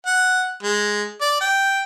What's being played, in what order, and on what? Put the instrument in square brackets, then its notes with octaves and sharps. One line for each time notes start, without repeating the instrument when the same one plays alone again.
[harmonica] F#5
G#3
D5
G5